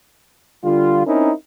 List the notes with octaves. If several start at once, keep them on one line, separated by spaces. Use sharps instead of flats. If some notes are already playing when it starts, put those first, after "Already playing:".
D3 G3 F4
C4 C#4 D#4 E4 A#4